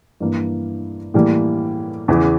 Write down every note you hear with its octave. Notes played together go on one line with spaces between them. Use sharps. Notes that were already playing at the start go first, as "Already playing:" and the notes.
G2 E3 A#3
A2 E3 G3 A#3
E2 C#3 E3